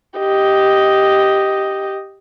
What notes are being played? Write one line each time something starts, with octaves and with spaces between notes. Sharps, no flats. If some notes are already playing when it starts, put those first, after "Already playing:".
G4 D#5